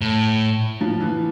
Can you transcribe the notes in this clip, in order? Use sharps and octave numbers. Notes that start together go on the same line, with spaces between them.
A2
F3
E3